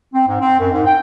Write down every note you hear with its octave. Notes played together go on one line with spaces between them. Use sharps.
C4
G#2
C4
F#2
G#2
G5